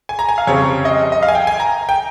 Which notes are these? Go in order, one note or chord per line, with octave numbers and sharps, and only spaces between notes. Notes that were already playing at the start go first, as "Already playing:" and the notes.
G#5
A#5
G#5
F5
F2 C#3 G3 C4 C#5
D#5
D#5
F5
G#5
G5
G#5
A#5
G5